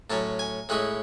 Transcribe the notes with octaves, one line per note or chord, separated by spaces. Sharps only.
A2 F#3 C#4 A5
G#5
A2 G#3 C#4 E4 F#5